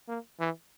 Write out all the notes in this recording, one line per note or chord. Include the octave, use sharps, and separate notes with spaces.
A#3
E3